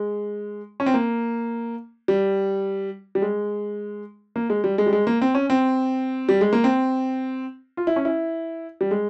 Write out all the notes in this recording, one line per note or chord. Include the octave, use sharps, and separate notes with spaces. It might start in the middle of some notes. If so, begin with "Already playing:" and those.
Already playing: G#3
C#4
C4
A#3
G3
G3
G#3
A#3
G#3
G3
G#3
G3
G#3
A#3
C4
C#4
C4
G3
G#3
A#3
C4
F4
E4
C#4
E4
G3
G#3